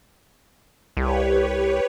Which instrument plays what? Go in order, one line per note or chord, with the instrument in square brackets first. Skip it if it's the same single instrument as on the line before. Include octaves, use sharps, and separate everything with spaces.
[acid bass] C2 [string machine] G4 B4 C#5